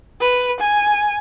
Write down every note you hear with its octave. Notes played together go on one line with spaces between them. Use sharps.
B4
G#5